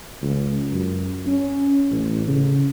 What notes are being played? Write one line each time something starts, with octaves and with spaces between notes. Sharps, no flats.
C#2
F#2
C#4
A1
C#3